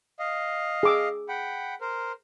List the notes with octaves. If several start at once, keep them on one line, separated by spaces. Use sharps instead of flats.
D#5 F5
G#4 D6 E6
F#5 G5 B5
A#4 C5